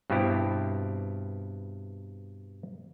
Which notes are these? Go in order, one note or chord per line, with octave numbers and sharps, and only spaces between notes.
G2 B2 C4 E4 G4